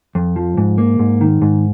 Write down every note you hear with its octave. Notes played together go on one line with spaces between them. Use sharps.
F2
F3
G#2
A#3
G#2
D#3
G#2